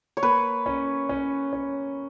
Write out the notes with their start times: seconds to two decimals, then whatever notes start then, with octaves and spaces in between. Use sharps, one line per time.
0.17 C#5
0.23 A#3 B4
0.66 C#4
1.09 C#4
1.53 C#4